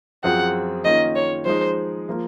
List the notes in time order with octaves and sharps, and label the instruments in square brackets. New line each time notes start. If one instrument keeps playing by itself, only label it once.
[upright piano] F#2 F3 C4 F4 G#4 [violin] F#5
[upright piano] D#3 A#3 C#4 F4 [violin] D#5
[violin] C#5
[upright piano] F3 G#3 D#4 G#4 [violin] C5
[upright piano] F3 A#3 F4